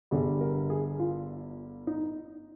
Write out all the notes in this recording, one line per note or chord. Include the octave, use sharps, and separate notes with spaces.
G1 G2 D3 G3 G#4
A#4
G#4
F4
D#4